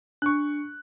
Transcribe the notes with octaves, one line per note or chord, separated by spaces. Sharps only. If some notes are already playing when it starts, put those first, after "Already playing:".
D4 C#6 F#6